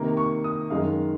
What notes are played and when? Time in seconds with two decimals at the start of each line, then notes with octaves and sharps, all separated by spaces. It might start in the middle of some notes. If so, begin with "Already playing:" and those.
Already playing: C3 D#3 A#3 A#5
0.17 C#6
0.44 D#6
0.70 F#2 D#3 G#3 D#4 F5